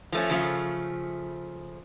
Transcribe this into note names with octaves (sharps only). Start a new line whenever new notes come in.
F3 A3 C#4
C#3 F3 A3